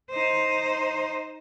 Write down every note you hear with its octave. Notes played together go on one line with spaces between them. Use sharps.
D#4 C5